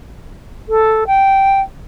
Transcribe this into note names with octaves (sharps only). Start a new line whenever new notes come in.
A4
G5